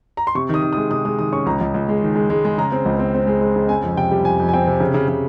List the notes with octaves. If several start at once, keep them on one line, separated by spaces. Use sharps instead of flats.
A#5
C6
C3 C#6
D#3
D#6
D#3
D#6
G#3
C3 D#6
G#3 D#6
D#3 D#6
C#4 C#6
C#2 A#5
C#2
C#2
G#3
D#3
G#3
G#3
G#3
C#3 A#5
C4
C#2
C4
C4
G#3
G#3
C#3
C4 G#5
F2
C3 G5
G3
F2 G#5
F2
G#5
C4 G5
C3
C#3
C#3
C#3